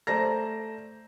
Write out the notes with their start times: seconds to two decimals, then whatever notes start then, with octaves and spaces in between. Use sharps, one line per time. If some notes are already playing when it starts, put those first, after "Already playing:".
0.07 A3 C5 D5 A#5 A#6